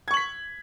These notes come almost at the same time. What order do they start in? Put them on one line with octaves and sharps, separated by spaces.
G#6 C#6 F#7 B6